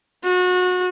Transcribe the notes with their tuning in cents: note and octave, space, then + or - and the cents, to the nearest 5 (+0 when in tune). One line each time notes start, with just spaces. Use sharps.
F#4 -30